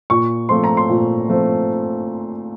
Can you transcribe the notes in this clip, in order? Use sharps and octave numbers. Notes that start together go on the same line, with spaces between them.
A#2 C#6
F3 A3 C4 C6
A#5
C6
A#2
F3 A3 C4